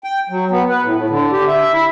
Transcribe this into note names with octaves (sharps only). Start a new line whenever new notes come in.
G5
F#3
B3
B4
A2
A2
D3
G4
E5
E4